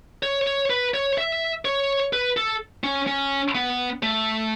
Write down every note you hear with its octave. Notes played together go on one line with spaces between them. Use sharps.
C#5
C#5
B4
C#5
E5
C#5
B4
A4
C#4
C#4
B3
A3